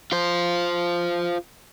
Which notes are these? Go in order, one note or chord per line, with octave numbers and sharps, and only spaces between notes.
F4 C5